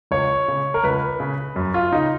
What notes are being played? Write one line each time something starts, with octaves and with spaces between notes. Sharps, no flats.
C#2 C#5
C#3
A#4
C#2 B4
C#3
F#2
F4
C#3 D#4